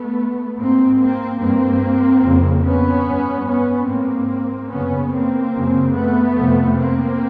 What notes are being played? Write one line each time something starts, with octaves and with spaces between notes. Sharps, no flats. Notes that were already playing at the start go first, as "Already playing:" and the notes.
Already playing: A3 B3
G#2 A#3 C4
A#3 C4
G2 A#3 C4
F2 C#3
B3 C#4
G2
B3 C#4
G#2 A#3 C4
F#2 C#3 B3 C#4
A#3 C4
F#2 C#3
A3 B3
F2 C3
A#3 C4